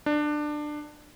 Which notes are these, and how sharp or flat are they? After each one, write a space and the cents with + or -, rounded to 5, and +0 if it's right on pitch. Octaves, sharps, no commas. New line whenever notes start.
D4 +20